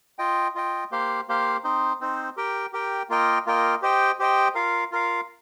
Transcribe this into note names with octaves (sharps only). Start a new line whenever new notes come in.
F4 D#5 G5
F4 D#5 G5
A#3 G4 C5 F5
A#3 G4 C5 F5
C4 D#4 C5
C4 D#4 C5
G4 A#4 G5
G4 A#4 G5
A#3 F4 A#4 D#5 G5
A#3 F4 A#4 D#5 G5
G4 C5 D#5 G5
G4 C5 D#5 G5
F4 A#4 F5
F4 A#4 F5